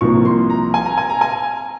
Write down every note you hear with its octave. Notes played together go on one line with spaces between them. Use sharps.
C2 C3 F3 A#3 C#6
C6
A#5
G#5
A#5
G#5
A#5
G#5